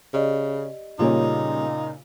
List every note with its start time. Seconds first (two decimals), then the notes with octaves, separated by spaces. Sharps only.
0.14 C#3 G4 D5 D#5
0.99 A#2 C#3 G3 A#3 C#4 D#4 F4